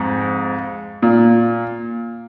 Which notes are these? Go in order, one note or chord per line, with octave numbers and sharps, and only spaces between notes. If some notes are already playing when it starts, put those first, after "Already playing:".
Already playing: F2 G#2
A#2